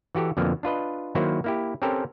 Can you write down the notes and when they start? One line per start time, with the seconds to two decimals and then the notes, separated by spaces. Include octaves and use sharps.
0.15 E3 F#4 G4 A4
0.37 F2 B2 D3 F3 A#3 B3
0.63 D4 F4 B4 D#5
1.15 D#3 F#3 A#3 E4 F#4 C5
1.44 A#3 E4 G4
1.82 C4 C#4 G4 A4 A#4 C5